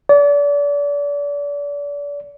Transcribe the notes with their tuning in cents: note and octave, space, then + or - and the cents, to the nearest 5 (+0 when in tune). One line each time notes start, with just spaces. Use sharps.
D5 -35